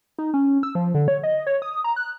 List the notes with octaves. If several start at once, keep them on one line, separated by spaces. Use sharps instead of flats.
D#4
C#4
E6
F3
D3
C#5
D#5
C#5
D#6
A#5
F#6